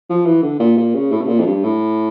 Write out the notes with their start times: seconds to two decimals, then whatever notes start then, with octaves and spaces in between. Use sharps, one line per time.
0.10 F3
0.26 E3
0.42 D3
0.59 A#2
0.77 A#2
0.95 C#3
1.12 A2
1.22 C#3
1.28 A#2
1.39 F2
1.46 G2
1.64 A2